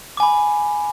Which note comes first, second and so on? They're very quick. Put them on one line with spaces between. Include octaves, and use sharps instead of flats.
D6 G#5 B5